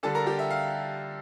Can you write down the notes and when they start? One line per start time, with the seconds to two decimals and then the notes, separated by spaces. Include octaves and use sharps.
0.03 D3 G3 D4 A4 A5
0.15 A#4 A#5
0.27 G4 G5
0.39 E5
0.50 F5